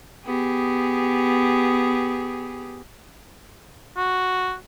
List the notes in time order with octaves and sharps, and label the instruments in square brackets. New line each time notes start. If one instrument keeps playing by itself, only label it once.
[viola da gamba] B3 G4 G#4
[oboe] F#4